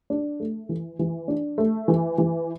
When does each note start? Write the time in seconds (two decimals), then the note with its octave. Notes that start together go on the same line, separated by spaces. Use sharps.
0.10 D4
0.40 A3
0.69 E3
0.99 E3
1.28 D4
1.58 A3
1.88 E3
2.18 E3